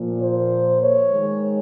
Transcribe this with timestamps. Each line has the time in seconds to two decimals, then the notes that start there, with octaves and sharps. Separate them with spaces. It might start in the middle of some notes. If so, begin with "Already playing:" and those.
Already playing: A#2 F3 A#3
0.20 C5
0.81 C#5
1.11 D#3 G#3